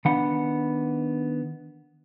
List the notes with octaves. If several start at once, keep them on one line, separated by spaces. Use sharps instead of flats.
D#3 B3 D4 F#5 B5